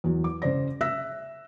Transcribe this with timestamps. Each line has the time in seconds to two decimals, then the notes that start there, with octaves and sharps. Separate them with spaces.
0.04 E2 F#3
0.24 D6
0.42 C#3 C5 D5 A#6
0.81 E5 E6 F#6 A#6 B6